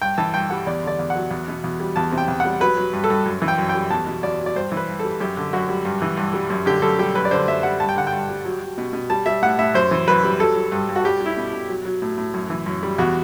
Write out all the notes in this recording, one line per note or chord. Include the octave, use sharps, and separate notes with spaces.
G2 G5
E3 A5
G2 G5
G3 F#5
E2 D5
D3 D5
E2
F#5
F#3
E2
B2
E2
G3
E2 A5
C3
G5
E2
G3 F#5
F#3 B4
F#3
G2
A4
G2
F#2
E3
G5
F#2
G5
G3
E2 A5
B2
E2 D5
F#3
D5
G2 C5
E3
B4
G2
G3 A4
F#2 G4
D3
F#2 F#4
G3
G2
E3
G2
G3
F#2
D3 G4
F#2 A4
G3 G4
F#2 B4
D5
D3 C5
F#2 E5
G3 F#5
G2 A5
G5
D3 F#5
G5
G2
G3
F#3
F#3
B2
B2
G3 A5
G3 E5
A2 F#5
A2 E5
F#2 C5
E3
F#2 B4
G3
F#3 A4
F#3
G2
G2
F#4
G3 G4
G3
E4
B2
B2
F#3
F#3
A2
A2
F#2
E3
F#2
G3
E2 F#4